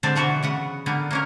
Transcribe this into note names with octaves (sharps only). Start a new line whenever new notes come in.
D3 G3 G#3 C4 D4 D5
B2 D3 E3 F#4 A4 E5
C#3 B3 F#5
D3 G3 A#3 B3
A#3 C#4 A#4